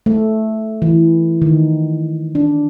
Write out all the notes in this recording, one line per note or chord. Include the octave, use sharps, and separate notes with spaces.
A3
E3
D#3
D4